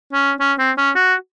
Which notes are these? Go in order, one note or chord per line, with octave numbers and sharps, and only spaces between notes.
C#4
C#4
C4
C#4
F#4